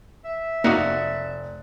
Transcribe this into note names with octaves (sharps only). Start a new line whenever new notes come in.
E5
F1 A#3 D#4 F#4 D5 F#6 C#7